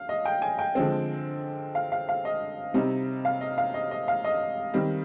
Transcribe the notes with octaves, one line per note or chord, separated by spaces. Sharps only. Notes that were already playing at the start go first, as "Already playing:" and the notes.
Already playing: F5
D#5
G5
G#5
G5
D3 F3 G#3 C4
F5
F5
F5
D#5
C3 G3 C4 D#4
F5
D#5
F5
D#5
D#5
F5
D#5
D#3 G3 C4